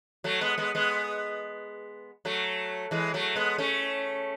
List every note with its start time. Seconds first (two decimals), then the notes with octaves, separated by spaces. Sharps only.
0.24 F#3 A3
0.41 G#3 B3
0.58 G#3 B3
0.75 G#3 B3
2.25 F#3 A3
2.91 E3 G#3
3.14 F#3 A3
3.36 G#3 B3
3.58 A3 C#4